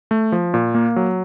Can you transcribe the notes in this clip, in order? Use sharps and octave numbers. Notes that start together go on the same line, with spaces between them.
A3
F3
A#2
A#3
F#3